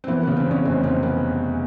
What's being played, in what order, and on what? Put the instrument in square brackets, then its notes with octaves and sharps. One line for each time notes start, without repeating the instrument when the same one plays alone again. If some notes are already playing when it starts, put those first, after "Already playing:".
[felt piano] C4
E3 B3
C#3 B3
C4
E2 C#4
F1 C4
F1 C4
B3